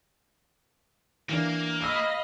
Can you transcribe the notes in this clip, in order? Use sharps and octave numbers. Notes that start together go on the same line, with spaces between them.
E3 A#3 D4
D#5 F5 B5 E6 D7